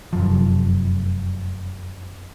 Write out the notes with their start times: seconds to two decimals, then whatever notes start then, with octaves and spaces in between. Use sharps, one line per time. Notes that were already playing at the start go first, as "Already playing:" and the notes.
0.13 F1 F#2 F3